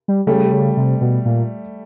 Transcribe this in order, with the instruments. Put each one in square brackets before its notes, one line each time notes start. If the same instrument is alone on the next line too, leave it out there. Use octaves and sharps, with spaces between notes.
[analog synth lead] G3
[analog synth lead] C#3 [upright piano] G3 A3
[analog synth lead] C3
C#3
C3
B2
A#2